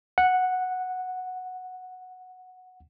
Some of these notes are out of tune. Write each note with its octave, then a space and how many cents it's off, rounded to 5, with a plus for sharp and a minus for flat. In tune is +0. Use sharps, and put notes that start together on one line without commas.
F#5 -5